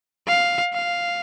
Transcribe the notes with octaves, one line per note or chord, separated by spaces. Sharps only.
F5
F5